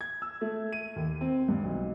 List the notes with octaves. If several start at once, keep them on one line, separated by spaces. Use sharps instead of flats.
G#6
E6
A3
D#7
D#2
C4
G2
B1